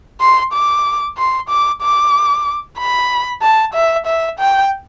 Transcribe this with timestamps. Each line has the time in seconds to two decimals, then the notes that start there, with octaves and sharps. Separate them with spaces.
0.20 C6
0.53 D6
1.18 C6
1.49 D6
1.82 D6
2.79 B5
3.42 A5
3.74 E5
4.06 E5
4.40 G5